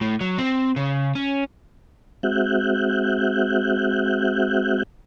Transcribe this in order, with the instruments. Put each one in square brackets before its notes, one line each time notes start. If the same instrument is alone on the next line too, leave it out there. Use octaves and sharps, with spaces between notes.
[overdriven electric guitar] A2
F#3
C4
C#3
C#4
[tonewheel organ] G#3 C4 F#4 E5 F#6 G6